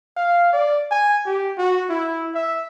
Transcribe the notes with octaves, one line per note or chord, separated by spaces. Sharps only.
F5
D5
G#5
G4
F#4
E4
E5